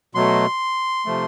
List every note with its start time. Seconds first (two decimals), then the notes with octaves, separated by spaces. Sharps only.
0.15 B2 F#3 A3 C6
1.06 C3 F3 A3